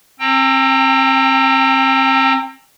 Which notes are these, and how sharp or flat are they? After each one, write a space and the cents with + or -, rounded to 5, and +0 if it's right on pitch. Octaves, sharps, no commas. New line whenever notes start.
C4 +35 G5 +10 A#5 -40